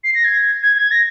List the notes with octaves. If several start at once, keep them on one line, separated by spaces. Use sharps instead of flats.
C7
A#6
G#6
G#6
G#6
A#6